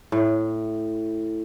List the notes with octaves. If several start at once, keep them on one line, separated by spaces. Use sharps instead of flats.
A2